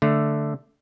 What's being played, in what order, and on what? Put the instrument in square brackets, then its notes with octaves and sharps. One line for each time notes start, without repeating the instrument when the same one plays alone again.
[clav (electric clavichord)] D3 A3